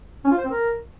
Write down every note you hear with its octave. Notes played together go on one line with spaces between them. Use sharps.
C#4
F4
C5
C4
A#4